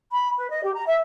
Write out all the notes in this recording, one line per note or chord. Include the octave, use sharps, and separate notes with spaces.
B5
B4
D#5
G4
A#5
E5